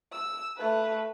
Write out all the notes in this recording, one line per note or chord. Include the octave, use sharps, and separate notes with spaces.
E6
A3 B4